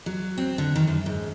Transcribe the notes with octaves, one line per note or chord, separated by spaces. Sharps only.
F#3
C4
D3
D#3
F#2
G#2